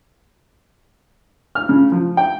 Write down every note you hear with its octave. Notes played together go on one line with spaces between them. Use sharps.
F6
C#3
F3
G5